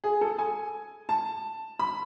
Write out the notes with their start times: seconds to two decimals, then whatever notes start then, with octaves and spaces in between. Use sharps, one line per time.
0.04 G#4
0.21 A4
0.39 G#5
1.09 A5
1.79 B5